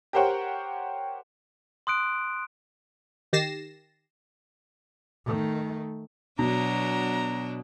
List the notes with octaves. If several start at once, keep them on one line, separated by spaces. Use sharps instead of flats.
G4 A#4 C5 C#5 F#5 G5
C6 D#6 F#6 D7
D#3 G4 A6 A#6 C7 E7
D#3 A3
B2 F#3 D4 A#5